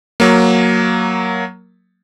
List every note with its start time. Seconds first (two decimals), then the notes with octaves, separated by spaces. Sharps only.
0.20 F#3 A#3